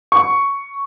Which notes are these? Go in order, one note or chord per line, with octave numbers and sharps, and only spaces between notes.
C#6